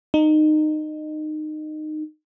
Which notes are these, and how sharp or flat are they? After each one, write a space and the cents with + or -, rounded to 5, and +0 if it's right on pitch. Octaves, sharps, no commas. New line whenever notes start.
D#4 -20